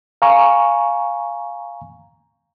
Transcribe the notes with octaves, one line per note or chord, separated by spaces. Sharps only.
F5 G#5 A#5 C#6